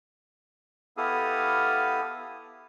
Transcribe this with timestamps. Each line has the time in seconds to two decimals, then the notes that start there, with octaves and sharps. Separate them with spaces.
0.97 B3 E4 G4 A4 F5 D#6